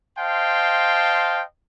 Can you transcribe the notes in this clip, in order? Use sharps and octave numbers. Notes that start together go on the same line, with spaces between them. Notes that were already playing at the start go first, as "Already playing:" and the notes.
C5 D#5 F5 G5 A5 C6